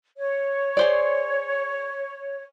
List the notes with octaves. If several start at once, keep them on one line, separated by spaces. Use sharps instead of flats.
C#5
G#4 C5 D5